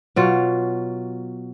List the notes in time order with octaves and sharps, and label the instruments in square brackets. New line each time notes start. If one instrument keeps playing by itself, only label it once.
[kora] B2 F#3 F4